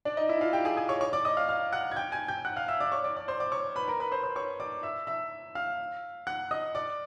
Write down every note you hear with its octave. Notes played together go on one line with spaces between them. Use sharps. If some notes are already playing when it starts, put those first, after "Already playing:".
D4 D5
D#4 D#5
E4 E5
F4 F5
G4 G5
G#4 G#5
G#4 G#5
C#5 C#6
C#5 C#6
D5 D6
D#5 D#6
F5 F6
F5 F6
F#5 F#6
G#6
G5 G6
G#5 G#6
G5 G6
F#5 F#6
F5 F6
E5 E6
D5 D6
C#5 C#6
D5 D6
D5 D6
C5 C6
D5 D6
C#5 C#6
B4 B5
A#4 A#5
B4 B5
C5 C6
C5 C6
C#5 C#6
D5 D6
E5 E6
E5 E6
F5 F6
F#5 F#6
D#5 D#6
D5 D6